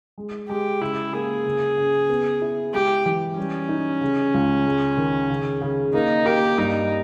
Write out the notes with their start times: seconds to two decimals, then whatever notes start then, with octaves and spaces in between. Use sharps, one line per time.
0.18 G#3
0.49 G#3 G4
0.81 C#3 E4
1.13 A#3 G#4
1.46 C#3
1.77 C#3
2.09 B3
2.42 E4
2.74 G#3 G4
3.06 E3
3.37 G3 C#4
3.69 D#4
4.01 C#3
4.34 C#2
4.66 G#3
4.97 D#3
5.30 C#3
5.61 C#3
5.93 A#3 D#4
6.26 A#3 G4
6.58 G2 D#4